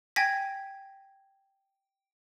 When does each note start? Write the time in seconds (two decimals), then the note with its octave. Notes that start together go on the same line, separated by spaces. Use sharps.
0.16 G5 G#5 G#6 A#6 B6